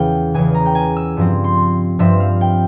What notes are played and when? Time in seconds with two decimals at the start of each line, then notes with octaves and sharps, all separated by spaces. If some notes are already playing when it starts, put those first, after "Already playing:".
Already playing: E2 C#3 E3 F5 G5
0.34 E2 C#3 E3 G#5
0.55 A#5
0.66 G5
0.75 G#5
0.97 E6
1.17 G2 F3 C4
1.44 C6
1.99 G2 F3 C4 E5
2.20 F5
2.41 G5